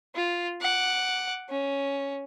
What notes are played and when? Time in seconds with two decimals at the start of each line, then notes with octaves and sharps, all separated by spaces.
0.15 F4
0.61 F#5 D6
1.49 C#4